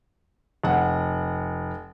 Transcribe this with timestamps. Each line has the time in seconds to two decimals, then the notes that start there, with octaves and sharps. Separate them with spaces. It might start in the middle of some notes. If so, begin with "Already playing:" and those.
0.63 F1 F#5